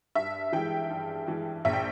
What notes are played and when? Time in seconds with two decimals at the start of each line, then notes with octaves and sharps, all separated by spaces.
0.15 G2 E5
0.52 E3 G#3 G5
0.90 G2
1.27 E3 G#3
1.65 A#1 E5
1.73 G5